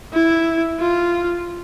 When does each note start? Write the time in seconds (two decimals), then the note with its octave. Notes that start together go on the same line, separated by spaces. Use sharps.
0.13 E4
0.79 F4